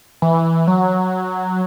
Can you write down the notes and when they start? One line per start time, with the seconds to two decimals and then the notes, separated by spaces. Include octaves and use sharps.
0.22 E3
0.67 F#3